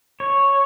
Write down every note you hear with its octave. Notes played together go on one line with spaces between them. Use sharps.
C#5